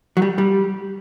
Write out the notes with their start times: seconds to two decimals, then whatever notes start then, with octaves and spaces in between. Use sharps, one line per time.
0.17 F#3
0.22 G3
0.38 G3